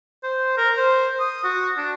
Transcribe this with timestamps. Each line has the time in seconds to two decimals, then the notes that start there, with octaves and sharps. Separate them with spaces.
0.23 C5
0.58 A#4
0.77 C5
1.20 D#6
1.44 F#4
1.77 D4